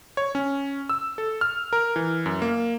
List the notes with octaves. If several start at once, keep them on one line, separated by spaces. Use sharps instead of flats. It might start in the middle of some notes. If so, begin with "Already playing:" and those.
C#5
C#4
E6
A4
F6
A#4
E3
F#2
A#3